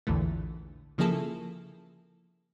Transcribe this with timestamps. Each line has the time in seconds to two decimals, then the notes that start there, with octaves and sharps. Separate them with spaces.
0.07 A#1 E2 A2 D3 E3 A3
0.98 C#3 F3 A#3 E4 G#4 A4